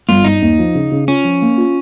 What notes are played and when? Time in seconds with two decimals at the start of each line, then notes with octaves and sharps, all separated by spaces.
0.09 G1 F4
0.24 G2 D#4
0.42 D#2
0.59 F3
0.75 C#3
0.91 C#3
1.08 C#4 F4
1.24 F3
1.42 A#3
1.57 F4